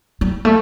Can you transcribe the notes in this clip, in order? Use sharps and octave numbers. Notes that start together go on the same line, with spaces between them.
G3
A3